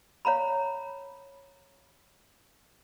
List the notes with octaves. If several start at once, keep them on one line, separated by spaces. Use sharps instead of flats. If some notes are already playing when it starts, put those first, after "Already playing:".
C#5 F5 A#5 B5